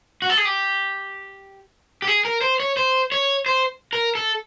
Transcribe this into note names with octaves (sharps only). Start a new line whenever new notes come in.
F#4
A4
G#4
G4
G4
G#4
A#4
C5
C#5
C5
C#5
C5
A#4
A4